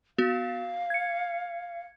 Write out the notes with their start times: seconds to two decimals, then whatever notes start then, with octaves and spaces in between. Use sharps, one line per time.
0.18 B3 F#4 F5
0.90 G#6 C#7